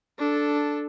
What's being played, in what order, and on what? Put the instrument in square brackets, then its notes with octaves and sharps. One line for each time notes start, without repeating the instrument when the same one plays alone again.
[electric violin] D4 A4